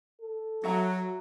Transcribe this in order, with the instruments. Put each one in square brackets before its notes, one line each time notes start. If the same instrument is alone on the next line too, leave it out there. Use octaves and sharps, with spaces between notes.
[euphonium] A4
[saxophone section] F#3 [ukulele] F#4 E5 A#5